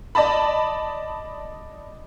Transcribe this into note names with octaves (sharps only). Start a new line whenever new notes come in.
D5 D#5 A5 B5